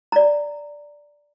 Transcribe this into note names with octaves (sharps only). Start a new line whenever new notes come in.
D5 A#5